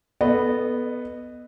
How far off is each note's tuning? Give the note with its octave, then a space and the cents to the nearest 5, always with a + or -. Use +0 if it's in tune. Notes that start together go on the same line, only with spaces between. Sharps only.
B3 +0 A4 -15 D#5 -25